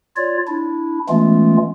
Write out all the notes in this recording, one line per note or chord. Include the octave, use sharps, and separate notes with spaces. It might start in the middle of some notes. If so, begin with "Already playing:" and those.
F4 C#5 D5
D4 E4
E3 G#3 A3 B3 C#4 F4